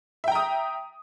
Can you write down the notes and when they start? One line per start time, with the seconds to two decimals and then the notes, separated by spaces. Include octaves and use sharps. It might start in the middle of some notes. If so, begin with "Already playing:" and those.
0.24 E5
0.28 G5
0.32 A#5
0.35 D#6